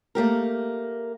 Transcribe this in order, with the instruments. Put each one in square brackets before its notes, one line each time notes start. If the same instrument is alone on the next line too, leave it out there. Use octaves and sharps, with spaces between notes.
[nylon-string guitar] A3 A#3 G4 A#4